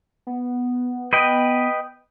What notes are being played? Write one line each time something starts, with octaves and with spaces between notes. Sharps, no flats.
B3
B4 D#5 G5